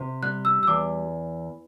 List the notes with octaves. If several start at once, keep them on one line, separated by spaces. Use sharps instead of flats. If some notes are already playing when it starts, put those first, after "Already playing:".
Already playing: C3
G3 F#6
E6
E6
E2 D6